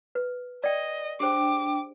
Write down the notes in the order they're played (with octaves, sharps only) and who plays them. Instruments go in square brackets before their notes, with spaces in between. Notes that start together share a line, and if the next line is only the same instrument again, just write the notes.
[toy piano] B4
[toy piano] D5 G5 [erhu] D#5
[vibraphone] D4 G5 [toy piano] G4 G#4 C5 [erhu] D6